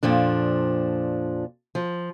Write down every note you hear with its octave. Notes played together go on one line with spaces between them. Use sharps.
F2 A#2 F3 D4
F3